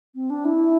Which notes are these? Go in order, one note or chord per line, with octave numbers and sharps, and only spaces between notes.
C4
D4
E4